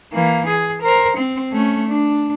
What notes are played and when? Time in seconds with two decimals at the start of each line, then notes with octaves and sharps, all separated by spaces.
0.13 E3 A#3
0.47 G#4
0.82 A#4 C5
1.17 C4
1.52 A3 C#4
1.88 D4